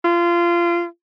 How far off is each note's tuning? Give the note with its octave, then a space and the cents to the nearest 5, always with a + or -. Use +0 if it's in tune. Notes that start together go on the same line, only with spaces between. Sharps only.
F4 -25